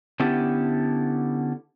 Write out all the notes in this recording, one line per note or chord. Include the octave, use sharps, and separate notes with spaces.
D3 B3 C#4 E4 G4 A4